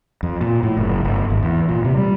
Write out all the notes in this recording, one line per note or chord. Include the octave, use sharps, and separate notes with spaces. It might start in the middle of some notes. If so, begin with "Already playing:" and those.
F2
A#2
A2
F#1
G1
G#1
E2
A#2
C3
G3